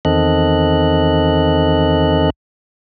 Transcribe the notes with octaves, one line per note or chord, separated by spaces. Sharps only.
E2 D#3 C4 A4 D#5 F#6